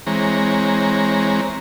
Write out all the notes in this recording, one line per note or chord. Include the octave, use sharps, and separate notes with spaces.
E3 G#3 C4 C#5 A#5